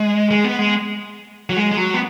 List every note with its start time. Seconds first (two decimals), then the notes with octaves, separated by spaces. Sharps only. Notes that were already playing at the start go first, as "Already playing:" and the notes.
Already playing: G#3
0.31 G#3
0.44 B3
0.59 G#3
1.50 F#3
1.56 G#3
1.72 G#3
1.77 F#3
1.94 B3